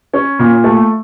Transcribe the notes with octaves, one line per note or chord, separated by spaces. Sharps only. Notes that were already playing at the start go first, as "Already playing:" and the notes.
C#4
A#2
A3